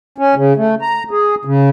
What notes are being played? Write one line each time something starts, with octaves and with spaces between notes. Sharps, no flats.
C#4
C#3
A3
A#5
G#4
C#3